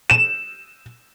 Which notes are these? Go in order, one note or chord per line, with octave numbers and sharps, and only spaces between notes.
E7